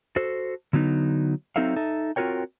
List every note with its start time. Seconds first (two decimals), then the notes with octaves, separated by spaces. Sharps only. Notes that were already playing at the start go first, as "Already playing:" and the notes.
0.16 F#4 A4 C5
0.73 D3 F#3 B3 D#4
1.56 F#3 C4 D#4 A4 E5 F5
1.76 D#4 A4 E5
2.16 C4 F4 F#4 A#4 C#5 G5